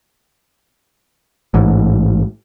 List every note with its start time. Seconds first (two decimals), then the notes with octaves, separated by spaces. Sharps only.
1.54 A1 G#2